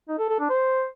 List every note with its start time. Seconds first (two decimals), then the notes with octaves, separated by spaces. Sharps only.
0.08 D#4
0.19 A4
0.29 A4
0.39 D4
0.50 C5